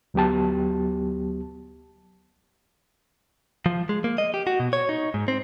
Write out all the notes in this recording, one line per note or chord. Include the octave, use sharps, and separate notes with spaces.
D2 F#3 B3 G4 A5
F3
G#3
A#3
D#5
G4
F#4
B2
C#5
D#4
G#2
C4